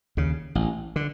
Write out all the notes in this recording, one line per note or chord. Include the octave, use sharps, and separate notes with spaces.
D#2 C#3
A1
D3